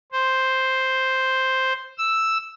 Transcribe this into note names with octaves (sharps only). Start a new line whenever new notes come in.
C5
E6